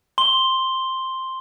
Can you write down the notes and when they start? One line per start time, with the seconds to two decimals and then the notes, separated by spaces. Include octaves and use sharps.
0.18 C6 G7